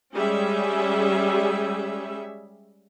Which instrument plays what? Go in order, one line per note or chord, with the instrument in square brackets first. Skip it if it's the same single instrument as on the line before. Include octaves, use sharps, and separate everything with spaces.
[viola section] G3 G#3 C#4 G#4 E5